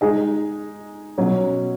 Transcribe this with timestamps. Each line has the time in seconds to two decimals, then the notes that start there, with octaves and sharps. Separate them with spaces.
0.01 G#3 D#4 G#4 D#5
1.18 B2 F#3 C#4